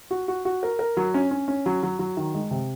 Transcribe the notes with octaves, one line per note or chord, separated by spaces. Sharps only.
F#4
F#4
F#4
A#4
A#4
F#3
C#4
C#4
C#4
F#3
F#3
F#3
D#3
G#3
C3